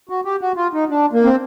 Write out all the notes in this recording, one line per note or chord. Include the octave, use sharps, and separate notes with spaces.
F#4
G4
F#4
F4
D#4
D4
A#3
C4